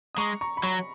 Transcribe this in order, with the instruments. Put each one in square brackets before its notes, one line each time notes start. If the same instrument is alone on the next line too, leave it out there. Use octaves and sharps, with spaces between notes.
[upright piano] D#6
[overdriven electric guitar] G#3 [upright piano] A#5 C#6
[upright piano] A#5 C#6
B5
[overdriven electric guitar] F#3 [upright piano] A#5 C#6